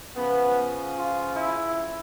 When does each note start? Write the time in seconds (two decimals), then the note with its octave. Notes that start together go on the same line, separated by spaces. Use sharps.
0.15 C#3 F3 B3
0.96 F4
1.35 E4